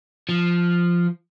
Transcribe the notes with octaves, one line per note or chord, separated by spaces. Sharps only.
F3